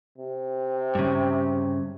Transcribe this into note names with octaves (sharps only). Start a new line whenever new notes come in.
C3
G2 C#3